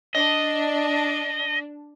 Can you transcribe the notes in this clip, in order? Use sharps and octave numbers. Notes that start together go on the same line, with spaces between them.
D4 D#5